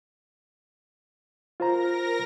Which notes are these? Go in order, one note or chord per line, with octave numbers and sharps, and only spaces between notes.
F4 A#4 C5 A#5 A#6